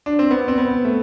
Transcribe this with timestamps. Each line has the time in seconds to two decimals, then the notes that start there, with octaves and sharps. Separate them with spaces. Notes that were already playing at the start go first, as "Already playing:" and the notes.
0.06 D4
0.19 C4
0.31 B3
0.48 C4
0.58 B3
0.85 A3